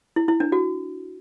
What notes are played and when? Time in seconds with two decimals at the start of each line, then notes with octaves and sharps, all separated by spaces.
0.16 E4
0.28 E4
0.40 D4
0.52 F#4